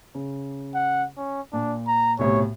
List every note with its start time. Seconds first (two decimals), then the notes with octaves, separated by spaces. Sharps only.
0.15 C#3
0.75 F#5
1.17 C#4
1.53 A#2 D4
1.87 A#5
2.19 B1 A2 C3 C#5